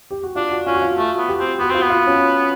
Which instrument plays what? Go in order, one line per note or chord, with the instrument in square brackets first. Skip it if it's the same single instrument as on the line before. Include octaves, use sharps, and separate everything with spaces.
[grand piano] G4
F#4
[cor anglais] D4 [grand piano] F4
[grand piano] F#4
[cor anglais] C#4 [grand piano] F4
[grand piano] F#4
F4
[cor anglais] A3 [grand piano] F#4
[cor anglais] B3
[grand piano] G4
[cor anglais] C4
[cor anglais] B3 [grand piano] F#4
[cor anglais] C4 [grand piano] F4
[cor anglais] B3
[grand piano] F4
C#4